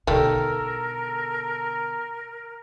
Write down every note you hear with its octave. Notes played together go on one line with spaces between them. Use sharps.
B2 D3 D#3 G3 A4 A#4